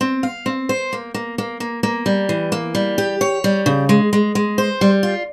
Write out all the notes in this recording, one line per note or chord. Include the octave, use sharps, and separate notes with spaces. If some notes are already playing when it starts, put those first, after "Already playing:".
C4
F5
C4
C5
A#3
A#3
A#3
A#3
A#3
G3
E3
A#3
G3
G4
C#5
G3
C#3
G#3
G#3
G#3
C5
G3
F4